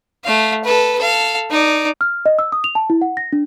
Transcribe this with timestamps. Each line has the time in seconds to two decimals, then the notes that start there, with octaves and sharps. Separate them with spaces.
0.24 A3 F5
0.64 A4 B4
0.98 A4 F5
1.50 D#4 D5
2.01 F6
2.26 D#5
2.39 E6
2.52 D#6
2.64 F7
2.75 A5
2.90 E4
3.02 F#5
3.17 A#6
3.33 D4